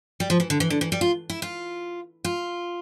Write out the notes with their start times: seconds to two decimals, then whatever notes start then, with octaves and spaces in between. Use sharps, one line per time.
0.20 G3
0.30 F3
0.40 E3
0.50 D3
0.60 E3
0.70 D3
0.81 E3
0.92 G3
1.01 F4
1.30 E4
1.42 F4
2.24 F4